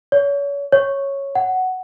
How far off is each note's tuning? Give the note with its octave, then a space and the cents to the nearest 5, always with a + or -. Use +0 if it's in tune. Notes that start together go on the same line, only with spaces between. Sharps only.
C#5 +35
C#5 -5
F#5 +5